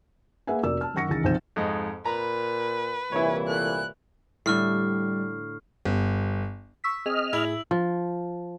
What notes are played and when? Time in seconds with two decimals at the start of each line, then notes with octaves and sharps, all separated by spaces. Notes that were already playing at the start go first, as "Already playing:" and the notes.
0.47 A#3 G#4 B4 E5 F#5 G#5
0.63 F1 F#4 A#4 D5 E6
0.81 A5 F6
0.94 F#2 D#3 F#5 C#6 A#6 C#7
1.09 C#2 D#3 E3 G#4 A6
1.24 B1 C3 F3 C4 G6 E7
1.56 F2 G#2 D#5
2.05 A#2 B4 A#5 B5
3.12 C2 A#2 E3 E4 C#5
3.48 A3 F#6
4.46 A2 D3 G3 C#6 F6 C7
5.85 G1
6.84 C#6 E6 B6
7.06 C4 G#4 D#5 F6
7.33 A2 E4 G#4 E6 G#6 F#7
7.71 F3